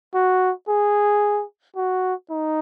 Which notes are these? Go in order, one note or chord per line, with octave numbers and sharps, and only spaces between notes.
F#4
G#4
F#4
D#4